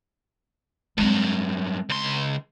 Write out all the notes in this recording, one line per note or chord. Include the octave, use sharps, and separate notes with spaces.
G2 F#3 G#3 C4
C#2 C6